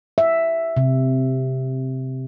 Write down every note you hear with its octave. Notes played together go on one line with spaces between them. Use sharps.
E5
C3